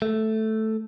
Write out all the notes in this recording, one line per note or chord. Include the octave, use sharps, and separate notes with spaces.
A3